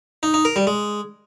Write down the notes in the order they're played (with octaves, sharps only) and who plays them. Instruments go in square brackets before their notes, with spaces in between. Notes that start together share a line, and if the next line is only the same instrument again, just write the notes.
[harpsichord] D#4
D#4
A#4
G3
G#3